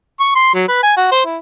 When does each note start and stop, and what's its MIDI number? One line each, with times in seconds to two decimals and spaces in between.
0.20 0.35 85
0.35 0.53 84
0.54 0.67 54
0.68 0.80 71
0.83 0.93 80
0.97 1.10 66
1.11 1.22 72
1.25 1.38 64